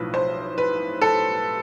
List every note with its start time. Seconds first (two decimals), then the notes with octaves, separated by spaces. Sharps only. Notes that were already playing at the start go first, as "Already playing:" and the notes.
Already playing: B1 A2 F3 B4
0.14 C5
0.58 B4
1.02 A4